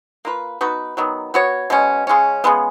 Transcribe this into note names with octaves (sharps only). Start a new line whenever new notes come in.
A#3 F4 B4
B3 D#4 F#4 B4
D#3 F#3 B3
B3 F#4 C#5
B2 G#3 C#4
C#3 G#3 C#4
C#3 G#3 B3